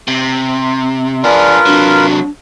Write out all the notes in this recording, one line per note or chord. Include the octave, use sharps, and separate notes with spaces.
C3
D4 F4 G#4 A#4 B4 D5
C3 F#3 D4